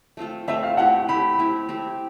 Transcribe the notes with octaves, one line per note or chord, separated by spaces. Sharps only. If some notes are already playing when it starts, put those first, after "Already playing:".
A3 C4 F4 A4
A3 C4 F4 A4 E5
F5
A3 C4 E4 G4 F#5
A3 C4 E4 G4 B5
A3 C4 E4 G4
A3 C4 E4 G4